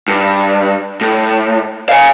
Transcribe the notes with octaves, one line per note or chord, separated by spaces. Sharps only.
G2
A2
F5 G#5